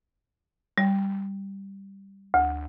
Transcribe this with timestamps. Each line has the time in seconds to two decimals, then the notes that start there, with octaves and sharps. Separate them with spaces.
0.78 G3
2.34 D2